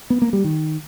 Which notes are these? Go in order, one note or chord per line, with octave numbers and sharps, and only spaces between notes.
B3
A#3
G3
D#3